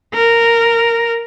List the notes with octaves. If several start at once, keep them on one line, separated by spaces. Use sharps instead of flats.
A#4